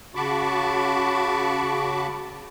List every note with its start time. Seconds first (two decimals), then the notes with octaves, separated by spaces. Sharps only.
0.15 C#3 F#4 A5 B5 C#6 D6